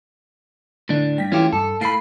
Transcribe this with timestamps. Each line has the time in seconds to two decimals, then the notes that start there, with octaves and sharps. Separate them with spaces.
0.89 A2 D3 D4
1.18 G2 G5 B6
1.32 E3 A3 C#4 E4 F4 G4
1.53 G2 A4
1.81 A2 A4 F5 A5 B5 C7